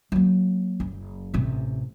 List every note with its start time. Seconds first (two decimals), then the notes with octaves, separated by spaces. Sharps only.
0.12 F#3 A#3
0.80 F#1
1.34 A1 C3